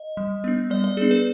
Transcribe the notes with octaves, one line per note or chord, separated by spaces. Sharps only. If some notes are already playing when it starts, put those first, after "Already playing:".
Already playing: D#5
G3
B3 D4
G3 D5
D5
B3 D4 G#4
B4